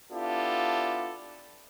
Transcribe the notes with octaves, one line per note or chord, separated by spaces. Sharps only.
B3 D4 E4 F4 G4 A4